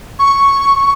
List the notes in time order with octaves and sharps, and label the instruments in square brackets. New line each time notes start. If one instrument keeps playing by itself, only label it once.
[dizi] C#6